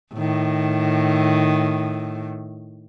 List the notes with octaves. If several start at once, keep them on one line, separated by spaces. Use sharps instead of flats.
A2 D#3